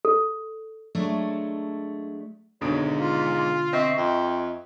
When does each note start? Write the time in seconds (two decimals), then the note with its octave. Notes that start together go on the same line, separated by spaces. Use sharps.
0.05 A4
0.95 F#3 G#3 A3 D4
2.61 G#1 G#2 B2 D3 C#5 D#6 D7
2.99 F4
3.73 C4 D#5 E5 C#6
3.97 F2 G5